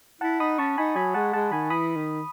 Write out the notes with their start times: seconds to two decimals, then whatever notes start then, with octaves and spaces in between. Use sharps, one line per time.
0.21 E4 F#5 A5
0.40 D#4 B5 D#6
0.58 C#4 A5 C#6
0.78 D#4 G#5 B5
0.96 F#3 G#5 B5
1.14 G#3 F#5 A5
1.33 G#3 F#5 A5
1.52 D#3 G#5 B5
1.70 E3 B5 D#6
1.96 D#3